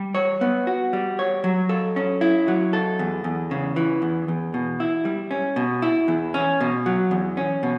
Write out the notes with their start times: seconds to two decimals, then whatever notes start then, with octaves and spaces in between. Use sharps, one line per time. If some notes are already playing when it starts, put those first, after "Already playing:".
Already playing: G3
0.15 C#5
0.41 B3
0.67 F#4
0.93 G3
1.19 C#5
1.44 F#3
1.69 A4
1.96 C#4
2.21 E4
2.48 F#3
2.73 A4
2.99 E2
3.24 E2
3.51 C#3
3.76 E3
4.02 E2
4.28 E2
4.54 B2
4.80 E4
5.05 G3
5.31 C#4
5.56 B2
5.82 E4
6.08 E2
6.34 C#4
6.61 B2
6.86 F#3
7.11 E2
7.37 C#4
7.63 B2